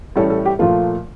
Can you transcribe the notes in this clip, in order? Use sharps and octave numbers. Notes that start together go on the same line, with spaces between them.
A2 E3 G3 C#4 A4
A4
G4
A#2 F3 A3 F4